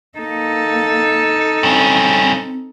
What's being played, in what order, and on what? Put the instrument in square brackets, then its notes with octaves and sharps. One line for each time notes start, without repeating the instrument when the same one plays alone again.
[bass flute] A#3 [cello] D#4 A4
[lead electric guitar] G2 C#4 [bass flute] C4